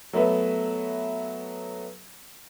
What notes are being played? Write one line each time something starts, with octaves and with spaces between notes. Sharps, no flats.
F#3 A3 B3 B4 E5